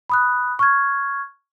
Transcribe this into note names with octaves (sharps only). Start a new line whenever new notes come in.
B5 D#6 F#6
C#6 F6 G#6